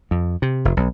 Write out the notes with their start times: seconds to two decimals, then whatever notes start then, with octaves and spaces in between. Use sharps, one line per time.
0.11 F2
0.42 C3
0.65 F1
0.77 B1